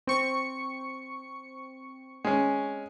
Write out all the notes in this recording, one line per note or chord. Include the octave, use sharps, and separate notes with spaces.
C4 C#6 C#7
G#3 C#4